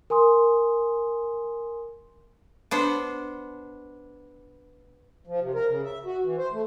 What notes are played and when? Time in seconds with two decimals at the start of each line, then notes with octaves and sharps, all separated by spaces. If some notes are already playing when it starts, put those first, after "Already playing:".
0.10 A#4 G#5 C6 D#6
2.71 B3 D4 C5
5.27 F3
5.40 C3
5.54 A#4
5.68 C#3
5.84 E5
6.06 F#4
6.24 E3
6.38 C5
6.53 A3